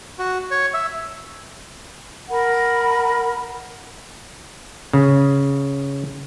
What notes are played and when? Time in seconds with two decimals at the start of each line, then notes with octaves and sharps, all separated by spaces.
0.19 F#4
0.51 C#5
0.74 E5
2.30 A#4 F#5 B5
4.93 C#3